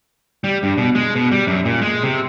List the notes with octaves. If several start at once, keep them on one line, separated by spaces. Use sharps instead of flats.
G3
G2
B2
G#3
B2
G3
F#2
A#2
G#3
C3